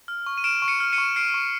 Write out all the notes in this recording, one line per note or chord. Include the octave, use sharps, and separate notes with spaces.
F6
C#6
D#7
F6 D7 E7
C#6
C#7 D#7
F6
C#7 D#7
C#6
F6 C7 D7
C#6